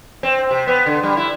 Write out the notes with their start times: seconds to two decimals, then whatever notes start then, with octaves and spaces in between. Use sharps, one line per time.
0.23 C4
0.51 C3
0.67 B3
0.86 D3
1.03 G3
1.17 E4